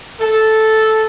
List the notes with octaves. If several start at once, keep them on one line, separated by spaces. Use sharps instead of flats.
A4